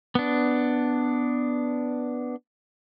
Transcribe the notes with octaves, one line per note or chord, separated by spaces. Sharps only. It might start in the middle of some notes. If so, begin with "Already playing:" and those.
B3 D4